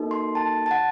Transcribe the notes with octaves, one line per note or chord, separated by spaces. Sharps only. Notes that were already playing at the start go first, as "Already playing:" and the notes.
Already playing: A#3 D#4 F#4 A4
C6
A5
A5
F#5